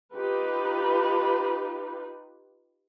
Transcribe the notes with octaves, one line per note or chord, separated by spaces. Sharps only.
D#4 F4 G4 B4